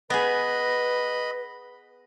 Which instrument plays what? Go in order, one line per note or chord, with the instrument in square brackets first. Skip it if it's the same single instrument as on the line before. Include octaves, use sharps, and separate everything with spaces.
[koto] B3 G#4 [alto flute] B4 [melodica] D#5 B5